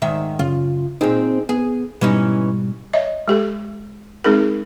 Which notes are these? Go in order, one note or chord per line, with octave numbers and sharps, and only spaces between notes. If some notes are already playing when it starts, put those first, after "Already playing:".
G#2 D#3 E5
F#2 C#3 F4
A#2 C4 D#4 G#4
B3 G#4
G#2 B2 E3 G3 C#4 D#4
C#5 D#5 E5
G#3 G4 A4
G#3 C4 D#4 G#4 A#4